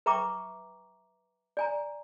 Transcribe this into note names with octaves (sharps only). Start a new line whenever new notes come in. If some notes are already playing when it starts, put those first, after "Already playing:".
B4 E5 G5 A#5 C#6 D6
D5 G#5 A#5